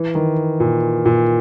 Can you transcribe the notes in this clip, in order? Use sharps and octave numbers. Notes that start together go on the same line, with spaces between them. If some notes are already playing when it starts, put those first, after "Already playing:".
Already playing: E3
D#3
A#2
A#2